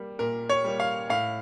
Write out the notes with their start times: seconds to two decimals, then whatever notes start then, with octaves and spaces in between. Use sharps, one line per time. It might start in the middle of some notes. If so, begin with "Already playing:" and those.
Already playing: G3 A#3
0.19 A#2 A#4
0.50 C#5
0.64 G3 A#3
0.80 F5
1.10 A2 F5